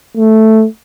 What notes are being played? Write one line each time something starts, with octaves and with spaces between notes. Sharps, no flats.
A3